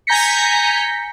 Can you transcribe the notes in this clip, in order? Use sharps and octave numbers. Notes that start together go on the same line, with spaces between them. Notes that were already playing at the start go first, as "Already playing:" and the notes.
G#5 A#5 G6 A#6 B6 C#7